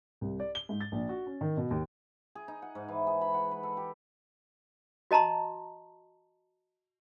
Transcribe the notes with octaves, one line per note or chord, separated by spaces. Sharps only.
C2
D5
G7
G#2
A6
A#1
F#4
C#4
D#3
B2
D#2
G#4
D#4
F#5
G#2
E3
G#4
B5
F#5
B4
A4
G4
F#4 D#5 A5 A#5 C6